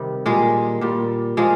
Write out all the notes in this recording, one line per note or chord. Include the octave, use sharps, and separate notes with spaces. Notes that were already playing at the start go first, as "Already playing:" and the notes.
Already playing: C3 D#3 G3
A#2 G3 G#3
A#2 G3
A#2 F3 G#3